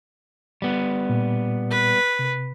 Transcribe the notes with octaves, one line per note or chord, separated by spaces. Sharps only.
G3 B3
A#2
B4
C3